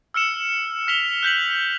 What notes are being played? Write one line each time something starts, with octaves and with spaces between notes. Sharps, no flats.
E6 F6 C#7 E7
F6 B6 F7 G7
F#6 G6 B6 F#7